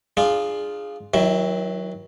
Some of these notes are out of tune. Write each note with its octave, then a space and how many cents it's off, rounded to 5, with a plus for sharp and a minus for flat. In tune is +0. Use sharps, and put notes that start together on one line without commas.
D4 +30 F4 +0 G#4 +0
D#3 +35 F#3 +0 E4 -5